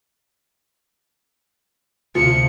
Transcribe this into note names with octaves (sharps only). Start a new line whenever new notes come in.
D2 C3 F3 C#7